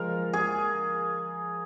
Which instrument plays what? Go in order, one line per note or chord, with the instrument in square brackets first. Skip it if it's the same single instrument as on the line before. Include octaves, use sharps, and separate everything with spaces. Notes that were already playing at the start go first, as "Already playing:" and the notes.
Already playing: [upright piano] F3 G#3 F4 [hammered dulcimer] A#4
[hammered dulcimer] G#4